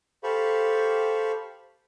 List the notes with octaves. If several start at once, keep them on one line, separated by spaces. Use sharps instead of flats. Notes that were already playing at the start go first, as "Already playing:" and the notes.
G4 A4 C5 F5 B5 C#6